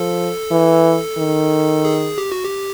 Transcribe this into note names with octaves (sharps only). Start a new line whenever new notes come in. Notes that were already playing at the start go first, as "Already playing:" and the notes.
Already playing: F3 A4
E3
D#3
G#4
G4
F#4
G4